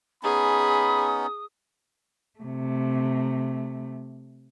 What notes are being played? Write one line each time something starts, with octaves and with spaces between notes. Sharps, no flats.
B3 C#4 D#4 G#4 B5 D#6
C3 A3